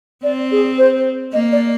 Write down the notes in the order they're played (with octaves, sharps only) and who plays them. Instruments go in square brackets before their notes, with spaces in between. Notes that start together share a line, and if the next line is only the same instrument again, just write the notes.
[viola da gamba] C4 [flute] D5
[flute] G#4
C5
[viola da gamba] A#3 [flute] D#5
[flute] D5